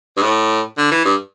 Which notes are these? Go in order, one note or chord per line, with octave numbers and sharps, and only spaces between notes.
G2
A2
D3
E3
G2